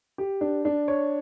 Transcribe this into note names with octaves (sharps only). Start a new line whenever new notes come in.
G4
D4
D4
C#5